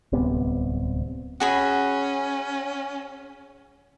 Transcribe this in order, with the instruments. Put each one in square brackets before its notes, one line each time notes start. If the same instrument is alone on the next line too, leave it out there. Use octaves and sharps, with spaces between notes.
[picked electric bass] D1 C2 C3 B3
[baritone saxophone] C#4 [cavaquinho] F#4 G#4 B5